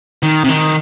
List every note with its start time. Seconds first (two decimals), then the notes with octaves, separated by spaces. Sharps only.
0.23 D#3
0.44 C3
0.49 D#3